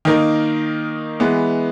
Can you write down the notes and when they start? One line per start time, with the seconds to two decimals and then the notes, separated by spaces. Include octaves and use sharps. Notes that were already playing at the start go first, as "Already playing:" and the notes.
0.05 D#3 A#3 D#4 A#4
1.20 E3 G#3 B3